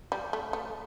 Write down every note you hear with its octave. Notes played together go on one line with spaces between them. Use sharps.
G3
A3
A3